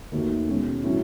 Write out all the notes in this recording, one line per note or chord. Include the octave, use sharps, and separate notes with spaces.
D#2 D#3 A3 D#4 F#4
B2 G#3 C#4
A2 F#3 C#4 E4